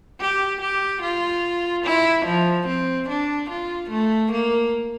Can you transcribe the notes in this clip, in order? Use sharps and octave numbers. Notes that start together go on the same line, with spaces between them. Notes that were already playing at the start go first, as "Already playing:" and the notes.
G4
G4
F4
E4
F3
C4
D4
F4
A3
A#3